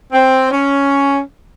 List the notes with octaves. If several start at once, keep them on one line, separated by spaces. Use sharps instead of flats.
C4
C#4